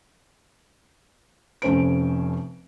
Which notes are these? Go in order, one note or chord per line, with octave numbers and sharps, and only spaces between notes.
F1 A3 C#4 C5 D7